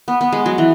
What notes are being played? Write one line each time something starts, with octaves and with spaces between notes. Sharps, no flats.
B3
B3
G#3
F#3
E3